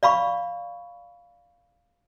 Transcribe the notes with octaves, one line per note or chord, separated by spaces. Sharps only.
D5 F5 B5 C#6